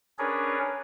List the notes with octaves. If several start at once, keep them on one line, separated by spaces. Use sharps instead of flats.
C#4 D4 G#4 A#4 B4 C#5